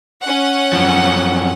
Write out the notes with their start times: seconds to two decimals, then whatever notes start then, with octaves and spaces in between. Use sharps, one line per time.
0.24 C#4 F#5
0.73 F#2 F3